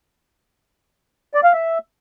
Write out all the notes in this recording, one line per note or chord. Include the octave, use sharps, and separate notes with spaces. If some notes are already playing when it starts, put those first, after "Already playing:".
D5
F5
E5